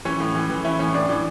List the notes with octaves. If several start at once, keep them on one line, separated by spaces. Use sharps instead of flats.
E3 C#4
A2
E3
E3
E3 C#4 E4
A2 C#4
A2 D4
E3 D4